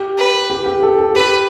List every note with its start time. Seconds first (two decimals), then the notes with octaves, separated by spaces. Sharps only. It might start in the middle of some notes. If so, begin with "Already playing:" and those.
Already playing: G4
0.18 B4
0.50 G4
0.66 G4
0.83 A4
0.99 A4
1.14 G4 B4